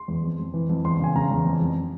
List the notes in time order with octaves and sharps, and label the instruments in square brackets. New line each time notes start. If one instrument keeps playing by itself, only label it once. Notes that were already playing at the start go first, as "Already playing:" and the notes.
Already playing: [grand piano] C6
E2
F2
F2
E3
F2
E2 C6
C#3 G#5
C#3 A#5
E2
F2
F2